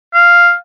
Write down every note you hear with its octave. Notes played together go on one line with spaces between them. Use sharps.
F5